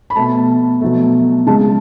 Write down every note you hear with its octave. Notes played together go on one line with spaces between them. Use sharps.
B5
B2 A3 A5
B2 F#3 A3
C#3 G#3 A5